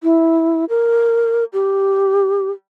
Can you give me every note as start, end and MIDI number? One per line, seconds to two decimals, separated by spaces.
0.03 0.65 64
0.69 1.44 70
1.53 2.50 67